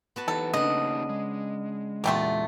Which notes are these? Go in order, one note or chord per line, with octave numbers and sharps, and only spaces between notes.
B3 F#4 A5
E3 D#4 G4 A4
C#3 A3 A#3 D4 D#4 D#5
G#3
E2 A#2 D3 G3 A3 F4